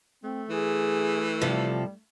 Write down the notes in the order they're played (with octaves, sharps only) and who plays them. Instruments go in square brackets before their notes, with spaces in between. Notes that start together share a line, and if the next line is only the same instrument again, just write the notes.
[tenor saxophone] A3 [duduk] C4
[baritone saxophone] E3 [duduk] G#4
[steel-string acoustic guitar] C3 F3 A4 [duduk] G3